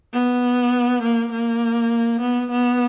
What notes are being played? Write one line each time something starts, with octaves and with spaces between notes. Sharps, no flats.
B3
A#3
A#3
B3
B3